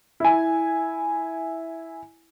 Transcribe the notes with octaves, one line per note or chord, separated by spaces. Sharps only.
E4 G#5